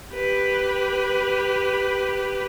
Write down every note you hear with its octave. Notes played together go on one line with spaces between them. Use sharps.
G4 B4